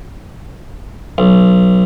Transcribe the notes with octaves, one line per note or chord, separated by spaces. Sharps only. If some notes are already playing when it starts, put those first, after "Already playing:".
B1